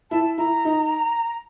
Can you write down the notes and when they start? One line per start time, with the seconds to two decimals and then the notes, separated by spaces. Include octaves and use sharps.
0.11 E4 A5
0.38 E4 A#5
0.65 D#4